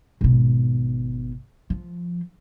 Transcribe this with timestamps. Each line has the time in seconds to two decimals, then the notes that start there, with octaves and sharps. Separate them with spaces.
0.21 G#1 B2
1.70 F3